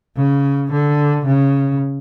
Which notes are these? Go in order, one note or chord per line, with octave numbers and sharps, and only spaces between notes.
C#3
D3
C#3